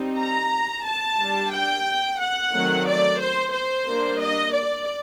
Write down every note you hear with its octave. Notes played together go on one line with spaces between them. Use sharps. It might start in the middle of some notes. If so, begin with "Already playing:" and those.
Already playing: G3 C4 D#4
A#5
A5
G3 D4
G5
F#5
D#3 F#3 A3 C4
D5
C5
C5
G3 A#3 D4
D#5
D5